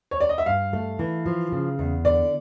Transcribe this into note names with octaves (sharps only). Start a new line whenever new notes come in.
C#5
D5
D#5
E5
G2 F5
A3
E3
F3
C#3
E2
D3 D5